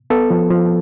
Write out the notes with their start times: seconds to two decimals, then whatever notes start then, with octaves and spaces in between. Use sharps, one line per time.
0.10 B3 A4
0.30 F3
0.51 F3